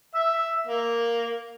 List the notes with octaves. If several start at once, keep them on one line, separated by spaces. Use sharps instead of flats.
E5 E6
A#3